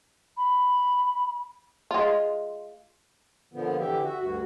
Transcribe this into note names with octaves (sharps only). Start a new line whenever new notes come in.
B5
G#3 F4
A#2 D3 F3 B3
D3 E3 G4 E5
F#4 E5
D2 G2 F#4